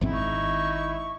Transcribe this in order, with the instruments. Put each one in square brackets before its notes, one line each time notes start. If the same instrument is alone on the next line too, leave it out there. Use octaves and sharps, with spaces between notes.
[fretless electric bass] G#1 G#2 C4 [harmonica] D#4 E4
[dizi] C#6